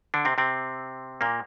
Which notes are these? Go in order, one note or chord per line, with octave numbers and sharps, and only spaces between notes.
D3 D4
C3 C4
C3 C4
A#2 A#3